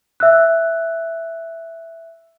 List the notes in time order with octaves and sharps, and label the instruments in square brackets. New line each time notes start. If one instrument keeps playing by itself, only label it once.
[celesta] E5 E6 F#6